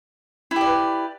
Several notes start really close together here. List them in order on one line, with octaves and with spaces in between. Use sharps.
E4 G4 D5 B4